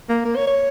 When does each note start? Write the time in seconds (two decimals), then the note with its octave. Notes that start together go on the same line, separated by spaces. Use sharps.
0.09 A#3
0.25 A#3
0.36 C#5
0.47 C#5